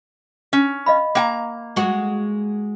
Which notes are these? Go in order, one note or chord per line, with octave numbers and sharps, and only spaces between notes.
C#4
D#5 F5 B5
A#3 F#5 A#5
G#3 F#4